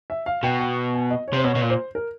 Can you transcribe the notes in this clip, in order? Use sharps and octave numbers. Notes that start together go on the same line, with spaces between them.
E5
F5
B2 G5
G5
G#5
D#5
C#5
C3 C5
B2 C#5
B2
A#2
C5
A#4